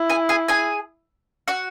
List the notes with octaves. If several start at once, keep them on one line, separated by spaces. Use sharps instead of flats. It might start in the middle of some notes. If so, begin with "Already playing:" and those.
Already playing: E4
G#4 G#5
G#4 G#5
G#4 G#5
F#4 F#5